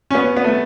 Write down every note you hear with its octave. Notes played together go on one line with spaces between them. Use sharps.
C#4
B3
B3
A3